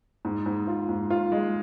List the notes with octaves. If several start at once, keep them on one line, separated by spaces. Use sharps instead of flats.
G#2
G#2
F4
G#2
F4
G#3